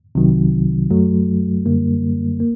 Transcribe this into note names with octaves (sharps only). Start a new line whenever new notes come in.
C2 C3 D#3 F#3
F#2 F#3 A3
F#2 D3 G3 A#3
A#3